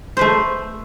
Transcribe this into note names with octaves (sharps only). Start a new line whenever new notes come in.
A3 B4 C5